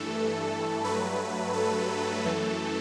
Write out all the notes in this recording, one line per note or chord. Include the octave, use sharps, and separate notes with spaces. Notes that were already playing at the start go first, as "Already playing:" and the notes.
Already playing: G2 E3 A3 A4
G2 F#3 A3 B4
A4
F#2 E3 A3